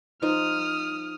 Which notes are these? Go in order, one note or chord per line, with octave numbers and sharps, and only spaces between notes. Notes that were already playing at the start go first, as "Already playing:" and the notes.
F3 D#4 C5 D#6 F6